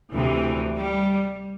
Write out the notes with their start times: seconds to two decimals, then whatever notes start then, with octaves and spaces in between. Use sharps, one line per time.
0.14 D2 C3 E3
0.77 G3